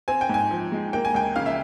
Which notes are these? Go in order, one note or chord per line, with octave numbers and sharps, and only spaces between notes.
C4 G#5
G5
G#2 G#5
F3
G#3
A#3 G5
G#5
C#2 G5
C#3 F5
E5